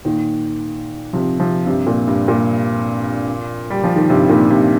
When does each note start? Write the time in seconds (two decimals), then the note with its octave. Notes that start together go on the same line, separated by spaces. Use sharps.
0.05 A#2 D#3
1.13 C3 F3
1.40 C3 F3
1.66 G2 C3
1.87 A#2
2.08 G2
2.28 A#2
3.70 G3
3.84 F3
3.96 D#3
4.10 G2 C3
4.30 A#2 D#3
4.50 G2 C3